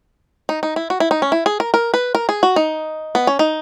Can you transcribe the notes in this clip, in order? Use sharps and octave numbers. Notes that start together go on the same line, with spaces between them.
D#4
D#4
E4
F#4
E4
D#4
C#4
E4
G#4
A#4
A#4
B4
A#4
G#4
F#4
D#4
B3
C#4
D#4